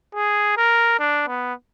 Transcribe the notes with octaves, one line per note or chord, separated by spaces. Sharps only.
G#4
A#4
D4
B3